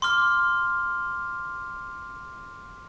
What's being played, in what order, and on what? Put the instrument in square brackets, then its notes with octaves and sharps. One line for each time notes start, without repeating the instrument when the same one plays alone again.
[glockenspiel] C6 D6 F6